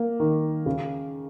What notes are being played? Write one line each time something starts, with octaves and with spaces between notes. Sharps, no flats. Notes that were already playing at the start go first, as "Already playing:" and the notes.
Already playing: A#3
D#3
C#3